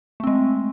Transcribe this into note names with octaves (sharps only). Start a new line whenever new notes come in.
G#3 A3 C4